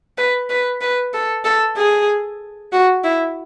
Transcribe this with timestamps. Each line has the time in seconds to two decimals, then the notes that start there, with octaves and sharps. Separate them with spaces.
0.18 B4
0.50 B4
0.82 B4
1.14 A4
1.45 A4
1.77 G#4
2.73 F#4
3.04 E4